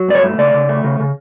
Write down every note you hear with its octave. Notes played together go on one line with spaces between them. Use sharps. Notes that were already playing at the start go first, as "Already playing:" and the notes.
Already playing: F#3
G2 D5
C#5
A3
C#3 D5
C#3
A3
C#3
C#3